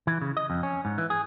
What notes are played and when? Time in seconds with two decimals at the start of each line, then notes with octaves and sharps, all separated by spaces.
0.07 E3
0.21 C#3
0.37 D#5
0.50 F2
0.63 C#4
0.85 G#2
0.98 E3
1.10 G#4